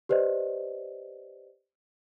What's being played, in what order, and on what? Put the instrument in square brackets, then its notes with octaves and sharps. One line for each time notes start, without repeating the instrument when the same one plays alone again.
[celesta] G4 B4 C5 D5 D#5